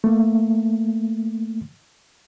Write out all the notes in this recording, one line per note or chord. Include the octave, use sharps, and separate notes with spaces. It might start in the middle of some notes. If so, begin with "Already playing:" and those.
A3 A#3